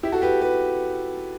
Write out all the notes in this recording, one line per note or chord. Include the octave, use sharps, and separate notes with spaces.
E4 G4
F#4 A4
G4 B4
G4 B4